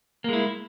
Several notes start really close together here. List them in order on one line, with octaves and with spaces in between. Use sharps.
A#3 G#3 E4